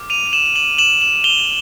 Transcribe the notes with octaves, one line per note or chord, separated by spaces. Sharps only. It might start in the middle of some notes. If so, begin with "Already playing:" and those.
Already playing: D6 F6
D#7 F7
F7
E7 F#7
E7 F#7
E7 F#7
E7 F#7
F7 G7